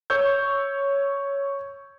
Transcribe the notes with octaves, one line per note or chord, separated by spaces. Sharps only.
C#5 C#6 E6 G6